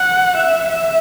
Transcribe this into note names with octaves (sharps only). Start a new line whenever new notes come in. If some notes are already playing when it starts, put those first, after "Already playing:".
Already playing: F#5
E5
E5